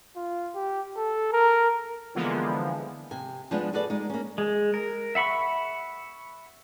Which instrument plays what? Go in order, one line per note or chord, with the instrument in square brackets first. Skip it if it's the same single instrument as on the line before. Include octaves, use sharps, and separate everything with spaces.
[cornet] F4
G4
A4
A#4
[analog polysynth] D3 E3 F3 G#3 A#3 B3
[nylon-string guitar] C3 G#5
F3 G#3 B3 D4 F4
F#4 G#4 A4 B4 D5
G#3 D#4
A#3 C#4
[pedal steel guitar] G#3
A#4
E5 F#5 B5 C#6